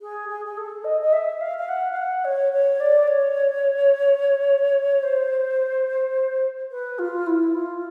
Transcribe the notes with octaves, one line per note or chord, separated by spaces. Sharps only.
G#4
G#4
G#4
A4
D#5
D#5
E5
F5
F5
F#5
F5
F#5
C#5
C#5
D5
C#5
C5
B4
F4
E4
F4